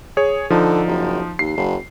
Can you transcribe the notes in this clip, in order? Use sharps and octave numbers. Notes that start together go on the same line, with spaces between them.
G#4 C#5
D3 F3 D#4
F#1
D#2 C7
F#1